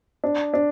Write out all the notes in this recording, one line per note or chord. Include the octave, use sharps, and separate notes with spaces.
D4
D4